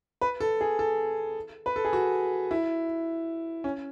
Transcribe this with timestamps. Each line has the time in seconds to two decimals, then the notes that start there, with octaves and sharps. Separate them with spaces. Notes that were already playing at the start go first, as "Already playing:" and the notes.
0.21 B4
0.40 A4
0.61 G#4
0.79 A4
1.66 B4
1.76 A4
1.85 G#4
1.93 F#4
2.51 E4
3.64 C#4